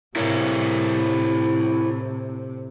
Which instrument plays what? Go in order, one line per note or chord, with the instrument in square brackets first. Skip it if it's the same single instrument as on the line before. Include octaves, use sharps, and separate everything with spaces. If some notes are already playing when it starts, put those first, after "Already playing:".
[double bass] A2 C3 [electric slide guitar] E4 A#4 C#5